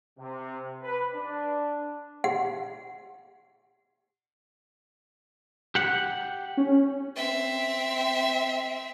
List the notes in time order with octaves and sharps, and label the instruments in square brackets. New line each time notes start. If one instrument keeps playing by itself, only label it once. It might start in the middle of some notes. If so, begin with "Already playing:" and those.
[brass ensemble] C3
B4
D4
[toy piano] F#5
[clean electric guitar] G4 F#5
[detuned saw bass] C#4
[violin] C4 E5